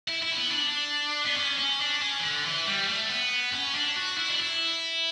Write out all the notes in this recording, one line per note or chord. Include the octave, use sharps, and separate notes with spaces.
E4
E4
C#4
B3
D4
B3
C#4
C#4
D4
C#4
E3
D3
E3
G3
A3
B3
C#4
D4
F#4
E4
D4
E4